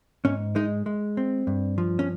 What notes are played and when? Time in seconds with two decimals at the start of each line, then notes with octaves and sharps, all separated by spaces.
0.25 G#2 C#4
0.56 G#3 D#4
0.86 G#3
1.17 C4
1.47 G2
1.78 F3
1.99 C#4